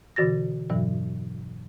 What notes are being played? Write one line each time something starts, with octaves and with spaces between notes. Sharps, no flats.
B2 D3 E3 F#4 A6 A#6
E2 G2 B2 E3 F#3